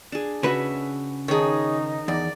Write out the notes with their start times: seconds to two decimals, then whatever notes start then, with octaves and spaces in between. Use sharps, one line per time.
0.12 D4 G#4
0.43 C#3 F#4 G#4 B4 E5
1.28 D#3 D#4 G#4 C#5
2.08 E2 D5